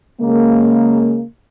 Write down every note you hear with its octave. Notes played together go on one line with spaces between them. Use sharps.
C#3 G#3 A#3